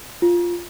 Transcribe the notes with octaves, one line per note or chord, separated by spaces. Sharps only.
F4